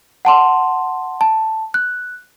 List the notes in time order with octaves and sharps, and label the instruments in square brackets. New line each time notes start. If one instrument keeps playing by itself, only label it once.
[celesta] F#5 A5 C6
A5
F#6